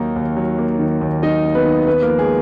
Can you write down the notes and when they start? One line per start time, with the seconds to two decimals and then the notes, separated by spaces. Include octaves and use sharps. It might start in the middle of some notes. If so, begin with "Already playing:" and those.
Already playing: D#2 D#3 F#3 A#3 D#4
0.16 D#2
0.37 F#3
0.59 A#3
0.79 D#3
1.01 D#2
1.22 F#3 D#4 D#5
1.44 A#3
1.55 B3 B4
1.65 D#3
1.86 D#2 B3 B4
2.02 A#3 A#4
2.08 F3
2.19 G#3 G#4